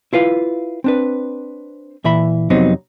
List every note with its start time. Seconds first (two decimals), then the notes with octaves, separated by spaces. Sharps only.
0.13 E4 F4 B4 F5
0.84 C4 D4 B4
2.04 A#2 E3 E5 B5
2.50 F2 C3 F#3 B3 C4 D#4